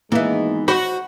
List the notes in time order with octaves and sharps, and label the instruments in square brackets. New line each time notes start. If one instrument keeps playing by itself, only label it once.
[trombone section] G#1 G#3 D#4 [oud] E3 B3 [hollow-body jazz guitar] A#3 E5
[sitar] F#4 [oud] C5 D#5 [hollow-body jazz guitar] B5